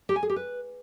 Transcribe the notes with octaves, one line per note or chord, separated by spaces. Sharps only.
G4
G#5
G#4
G4
B4